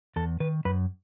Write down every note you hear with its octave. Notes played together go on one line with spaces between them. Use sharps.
E2 A4
D#3 B4
F#2 B4